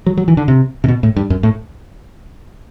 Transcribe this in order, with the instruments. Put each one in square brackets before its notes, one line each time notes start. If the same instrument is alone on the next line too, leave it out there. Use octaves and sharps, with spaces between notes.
[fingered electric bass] F#3
F#3
E3
D3
C3
C3
B2
A2
G2
F#2
A2